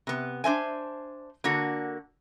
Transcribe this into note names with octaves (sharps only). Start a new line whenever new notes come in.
C3 B3
D4 C5 E5 G#5
D3 A#3 F#4